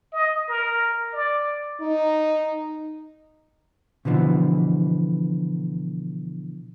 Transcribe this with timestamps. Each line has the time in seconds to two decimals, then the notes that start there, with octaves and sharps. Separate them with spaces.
0.13 D#5
0.49 A#4
1.13 D5
1.81 D#4
4.05 B2 D3 E3 F3